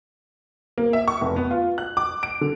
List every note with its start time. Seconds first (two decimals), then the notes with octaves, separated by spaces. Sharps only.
0.78 A#3
0.93 E5
1.08 C#6
1.21 F1
1.36 B3
1.51 F4
1.78 F#6
1.97 D6
2.23 D7
2.41 D3